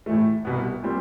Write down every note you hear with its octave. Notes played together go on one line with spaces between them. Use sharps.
A2 E3 A3
C2 B2 G3 B3
A#2 G3 C4